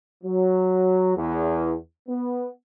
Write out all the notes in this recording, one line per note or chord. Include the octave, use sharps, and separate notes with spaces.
F#3
E2
B3